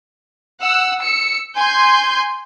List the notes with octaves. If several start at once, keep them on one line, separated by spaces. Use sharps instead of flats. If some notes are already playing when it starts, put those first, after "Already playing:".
F#5 E6
E6 C#7
G#5 C6 G6